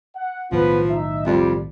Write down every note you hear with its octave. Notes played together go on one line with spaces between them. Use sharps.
F#5
B1 A2 D#3 F3 B3 F4 B4
D#4 E5
F2 G3